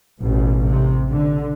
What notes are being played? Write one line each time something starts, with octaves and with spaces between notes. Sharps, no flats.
A1 B2
C3
D3